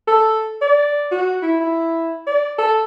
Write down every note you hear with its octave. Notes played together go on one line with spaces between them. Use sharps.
A4
D5
F#4
E4
E4
D5
A4